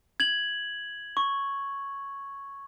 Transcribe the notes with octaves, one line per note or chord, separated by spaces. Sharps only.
G#6 F#7
C#6